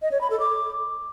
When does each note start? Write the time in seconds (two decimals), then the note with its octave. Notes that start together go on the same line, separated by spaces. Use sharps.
0.02 D#5
0.12 C#5
0.21 B5
0.30 A4
0.40 D6